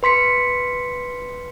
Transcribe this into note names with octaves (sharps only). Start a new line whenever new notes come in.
B4 C6 B6 C#7